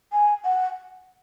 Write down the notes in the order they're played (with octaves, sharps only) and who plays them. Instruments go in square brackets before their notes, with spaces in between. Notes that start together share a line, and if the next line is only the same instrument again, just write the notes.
[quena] G#5
F#5